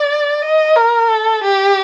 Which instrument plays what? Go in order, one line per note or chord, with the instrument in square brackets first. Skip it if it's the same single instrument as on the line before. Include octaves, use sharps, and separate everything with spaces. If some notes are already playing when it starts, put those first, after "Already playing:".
Already playing: [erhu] D5
D#5
A#4
A4
G4